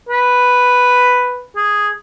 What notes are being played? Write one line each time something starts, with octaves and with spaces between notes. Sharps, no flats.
B4
G#4